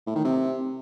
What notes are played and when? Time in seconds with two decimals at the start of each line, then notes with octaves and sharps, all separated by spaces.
0.07 A2
0.16 D#3
0.25 C3